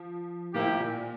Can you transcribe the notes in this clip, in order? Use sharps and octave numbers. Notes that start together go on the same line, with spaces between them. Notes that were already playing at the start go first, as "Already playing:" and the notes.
Already playing: F3
A2 F3 A#3 E4 G4
A2
A#2